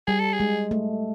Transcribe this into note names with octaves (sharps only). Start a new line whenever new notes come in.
G3 G#4
A4
G#4
G#3
A3